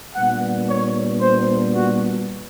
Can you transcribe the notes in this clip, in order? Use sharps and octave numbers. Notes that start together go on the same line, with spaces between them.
A#2 G3 B3 D4 F#5
C#5
C5
F#4